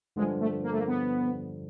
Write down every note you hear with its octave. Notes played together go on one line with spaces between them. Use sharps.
G2 D3 F3 G#3
A3
A#3
A3
A#3
B3